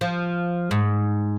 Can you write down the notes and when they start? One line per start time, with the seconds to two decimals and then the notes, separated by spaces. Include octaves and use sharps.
0.01 F3
0.71 G#2